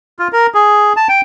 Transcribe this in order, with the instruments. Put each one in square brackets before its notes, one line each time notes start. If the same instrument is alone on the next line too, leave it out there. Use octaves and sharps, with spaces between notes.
[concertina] F4
A#4
G#4
A5
G5